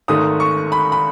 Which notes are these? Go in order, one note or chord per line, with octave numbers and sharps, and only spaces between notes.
G#1 G#2 D#3 A3 D#6
C#6
B5
B5